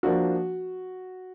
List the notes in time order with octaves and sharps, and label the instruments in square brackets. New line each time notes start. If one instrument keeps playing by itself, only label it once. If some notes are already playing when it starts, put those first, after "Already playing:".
[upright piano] F3 A#3 D4 F#4